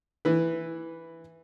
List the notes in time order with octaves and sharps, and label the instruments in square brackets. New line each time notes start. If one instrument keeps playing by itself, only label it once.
[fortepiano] E3 B4